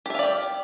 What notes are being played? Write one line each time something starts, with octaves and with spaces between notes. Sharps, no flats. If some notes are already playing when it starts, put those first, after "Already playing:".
G4 D5 E5 F5 G5